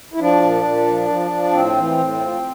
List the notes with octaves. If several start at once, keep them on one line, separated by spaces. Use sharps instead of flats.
E4
F3 D4
A#2
A#2
F3
F3
F3
A2 C4
E3
A2
F3